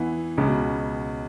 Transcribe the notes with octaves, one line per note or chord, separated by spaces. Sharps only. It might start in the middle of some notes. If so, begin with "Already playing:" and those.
Already playing: E2 E3
C#2 C#3
B2